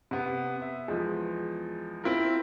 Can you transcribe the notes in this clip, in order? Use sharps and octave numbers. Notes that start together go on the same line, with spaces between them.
C3 B3
E5
E2 F3 G#3
C4 E4 F4 A#4